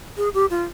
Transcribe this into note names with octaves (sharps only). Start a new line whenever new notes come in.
G#4
G4
F4